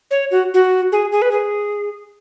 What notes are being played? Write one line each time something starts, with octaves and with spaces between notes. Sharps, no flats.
C#5
F#4
F#4
G#4
G#4
B4
G#4